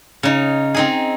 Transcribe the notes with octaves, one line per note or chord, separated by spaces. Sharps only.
C#3 D#4
C4 D#4 G#4